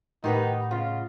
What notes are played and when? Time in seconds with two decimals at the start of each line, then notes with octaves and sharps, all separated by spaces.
0.24 A2 D#3 D#4 G4 B4 D#5 F#5
0.71 C#3 F4